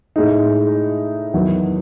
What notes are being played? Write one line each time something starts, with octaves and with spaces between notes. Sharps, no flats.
A2 G#3 D#4
E2 D#3 F#3 B3